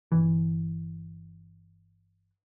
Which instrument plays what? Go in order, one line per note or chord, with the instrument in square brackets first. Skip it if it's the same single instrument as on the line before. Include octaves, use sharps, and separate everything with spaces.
[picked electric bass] G1 E3